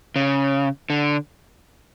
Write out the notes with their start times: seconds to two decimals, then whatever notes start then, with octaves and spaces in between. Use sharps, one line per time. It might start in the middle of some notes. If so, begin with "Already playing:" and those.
0.16 C#3
0.90 D3